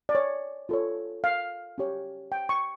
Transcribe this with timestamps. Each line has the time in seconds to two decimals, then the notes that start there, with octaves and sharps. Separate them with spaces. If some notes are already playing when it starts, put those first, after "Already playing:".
0.09 D5
0.15 C#5
0.69 F4 A4 C#5
1.24 F5
1.78 C#4 G4 C#5
2.32 G5
2.49 C#6